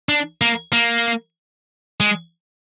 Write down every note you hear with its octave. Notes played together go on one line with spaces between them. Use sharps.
D4
A#3
A#3
G#3